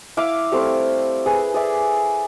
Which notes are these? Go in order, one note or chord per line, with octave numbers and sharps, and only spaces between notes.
E4 E5 F5 D6
G3 A3 C4
G#4 B4
G#4 D5 E5